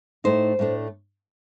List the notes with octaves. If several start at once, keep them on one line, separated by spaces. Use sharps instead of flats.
A2 A3 D#4 C5
A2 A3 D4